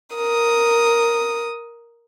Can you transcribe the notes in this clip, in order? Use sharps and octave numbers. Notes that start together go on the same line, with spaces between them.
A#4 D#6